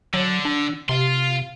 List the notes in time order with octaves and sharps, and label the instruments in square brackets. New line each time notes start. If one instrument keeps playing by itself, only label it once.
[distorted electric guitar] D3 [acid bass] F#3
[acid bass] D4
[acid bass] C3 [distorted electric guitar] F5 C6